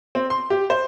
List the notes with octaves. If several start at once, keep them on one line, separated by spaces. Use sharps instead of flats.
C4
C6
G4
C5